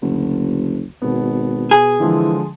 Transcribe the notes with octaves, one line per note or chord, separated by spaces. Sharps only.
F#1 D2
G#1 B2 B3
G#4
D3 E3 F3 G#3